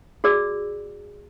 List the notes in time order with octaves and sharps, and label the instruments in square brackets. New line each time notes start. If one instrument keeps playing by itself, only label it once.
[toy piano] F#4 G#4 D5 E6